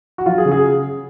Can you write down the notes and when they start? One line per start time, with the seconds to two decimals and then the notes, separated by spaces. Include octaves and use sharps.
0.18 F#4
0.26 F#3 F4
0.38 G#4
0.45 C#3
0.51 G#4